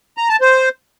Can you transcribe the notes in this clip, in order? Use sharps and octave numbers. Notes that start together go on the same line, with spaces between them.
A#5
A5
C5